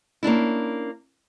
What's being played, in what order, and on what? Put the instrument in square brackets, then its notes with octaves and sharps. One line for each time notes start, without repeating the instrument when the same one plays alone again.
[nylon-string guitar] A#3 C#4 D4 E4